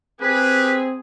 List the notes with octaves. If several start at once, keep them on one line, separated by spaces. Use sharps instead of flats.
C4 G4 G#4 B4